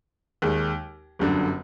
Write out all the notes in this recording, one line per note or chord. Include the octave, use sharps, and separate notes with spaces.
D#2 D#3 G#3
G1 F#2 D3